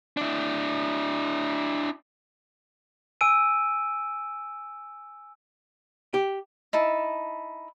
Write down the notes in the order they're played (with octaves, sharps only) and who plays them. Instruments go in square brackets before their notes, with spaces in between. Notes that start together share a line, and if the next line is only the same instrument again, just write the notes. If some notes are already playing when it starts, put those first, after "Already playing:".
[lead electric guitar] D4 E4
[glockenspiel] G#5 E6 D7 D#7
[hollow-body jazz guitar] G4
[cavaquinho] D#4 E4 A5